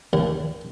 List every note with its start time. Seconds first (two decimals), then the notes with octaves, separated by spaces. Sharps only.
0.13 D#2